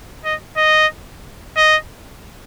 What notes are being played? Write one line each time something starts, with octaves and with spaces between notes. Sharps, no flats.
D#5
D#5
D#5